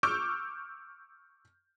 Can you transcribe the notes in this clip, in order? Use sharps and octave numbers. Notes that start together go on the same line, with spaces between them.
C#6 D6 E6 F6 G6